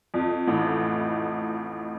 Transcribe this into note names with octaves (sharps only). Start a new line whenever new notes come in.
F2
A1 A2